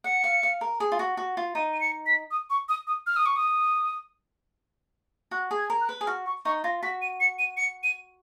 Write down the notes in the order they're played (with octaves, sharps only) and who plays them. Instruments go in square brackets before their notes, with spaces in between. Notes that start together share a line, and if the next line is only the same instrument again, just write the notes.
[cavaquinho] F#5 [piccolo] C#7
[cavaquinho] F5
F5
A#4
G#4
F4
F#4
F#4
F4
[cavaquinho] D#4 [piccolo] D#7
[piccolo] D#7
C#7
B6
D#6
C#6
D#6
D#6
F6
D#6
C#6
D#6
[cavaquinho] F#4 [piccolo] F#6
[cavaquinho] G#4
[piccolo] G#6
[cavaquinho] A#4
[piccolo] F#6
[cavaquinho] B4
G#4
[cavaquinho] F#4 [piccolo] F6
[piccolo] C#6
[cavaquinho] D#4 [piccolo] C#6
[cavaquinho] F4 [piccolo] A#6
[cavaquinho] F#4 [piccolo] B6
[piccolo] D#7
C#7
D#7
C#7
D#7